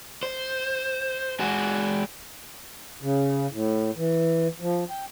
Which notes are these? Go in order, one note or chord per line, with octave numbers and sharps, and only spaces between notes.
C5
G#3 F#4
C#3
A2
E3
F3
G5